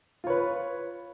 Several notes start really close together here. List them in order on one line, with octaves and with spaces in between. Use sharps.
F4 C#5 B4